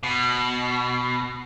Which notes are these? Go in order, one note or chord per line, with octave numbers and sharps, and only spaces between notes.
B2